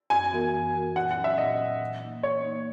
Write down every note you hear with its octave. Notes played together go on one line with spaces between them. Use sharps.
F#2 G#5
E3 B3 F#4 A#4
F#2
E3 B3 F#4 A#4
A#2 F#5
F#5
F#3 C#4
E5
A#2 D#5
F#3 C#4
E3
A#3 D#4
E3 C#5
A#3 D#4